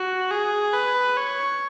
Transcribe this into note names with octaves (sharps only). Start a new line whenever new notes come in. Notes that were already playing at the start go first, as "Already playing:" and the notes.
Already playing: F#4
G#4
B4
C#5